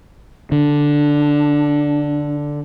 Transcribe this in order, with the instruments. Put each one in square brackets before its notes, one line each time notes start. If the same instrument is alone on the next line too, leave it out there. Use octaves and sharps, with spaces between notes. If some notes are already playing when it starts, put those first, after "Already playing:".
[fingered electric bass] D3 [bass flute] D4